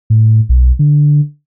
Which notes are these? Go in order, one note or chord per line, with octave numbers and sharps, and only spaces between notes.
A2
B1
D3